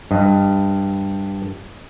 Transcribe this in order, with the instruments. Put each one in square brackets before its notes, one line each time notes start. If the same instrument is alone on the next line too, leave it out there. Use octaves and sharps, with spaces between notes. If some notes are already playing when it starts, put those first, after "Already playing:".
[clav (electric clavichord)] G2 D#5